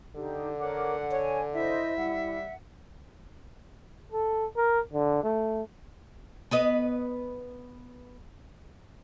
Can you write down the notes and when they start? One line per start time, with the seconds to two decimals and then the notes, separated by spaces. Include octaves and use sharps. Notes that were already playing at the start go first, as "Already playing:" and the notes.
0.16 D3 D#4 G4
0.60 A#4 C#5 F#5 D6
1.11 C#5 G#5
1.54 E4 C5 D#5 E5
1.97 G3 F#5
4.12 A4
4.57 A#4
4.93 D3
5.23 A3
6.51 B3 B4 D#5